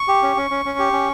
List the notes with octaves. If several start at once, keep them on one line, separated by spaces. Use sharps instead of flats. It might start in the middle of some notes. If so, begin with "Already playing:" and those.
Already playing: C#6
G4
C#4
C#4
C#4
C#4
G4
C#4